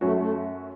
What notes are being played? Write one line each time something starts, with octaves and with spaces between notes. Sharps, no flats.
F#2 F#3 A3 C#4 F#4
A3